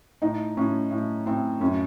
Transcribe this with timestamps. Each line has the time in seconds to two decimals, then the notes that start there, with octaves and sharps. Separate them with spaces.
0.22 A2 D#4
0.57 A2 C#4
0.91 A2
1.26 A2 C4
1.60 F#2 C#4